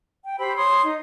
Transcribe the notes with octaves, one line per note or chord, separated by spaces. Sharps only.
G5
G4 C5 B5 E6
C#5 C6 D#6
D#4